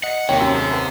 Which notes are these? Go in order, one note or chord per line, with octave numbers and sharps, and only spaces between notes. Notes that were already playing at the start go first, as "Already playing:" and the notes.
D#5 F#5
D#2 C3 C#5 G5
F#2
C#3 A3
B3